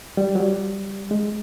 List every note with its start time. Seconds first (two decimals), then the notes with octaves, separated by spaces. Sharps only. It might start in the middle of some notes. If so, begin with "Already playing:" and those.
0.17 G3
0.35 F#3
0.40 G3
1.11 G#3